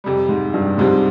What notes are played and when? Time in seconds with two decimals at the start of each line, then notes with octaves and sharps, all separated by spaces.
0.04 F2 C3 G3
0.29 G#2
0.54 G2
0.78 C2 G#2 C3 F3 C4